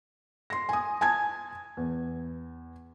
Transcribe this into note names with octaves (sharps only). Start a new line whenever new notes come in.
C6 A#6
G#5 D#6
G#5 A5 G#6
E2